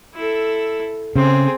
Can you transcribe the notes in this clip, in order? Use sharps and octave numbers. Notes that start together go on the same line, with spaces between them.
E4 A4
C#3 C4 G#4